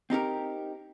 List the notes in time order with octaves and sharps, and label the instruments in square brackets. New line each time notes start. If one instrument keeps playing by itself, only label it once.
[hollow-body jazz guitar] C4 D#4 G4 A#4